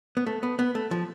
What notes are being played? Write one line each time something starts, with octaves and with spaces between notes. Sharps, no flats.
B3
A3
B3
B3
A3
F3